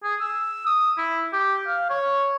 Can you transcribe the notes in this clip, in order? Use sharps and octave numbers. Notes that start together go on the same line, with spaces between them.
G#4
E6
D#6
E4
G4
F5
C#5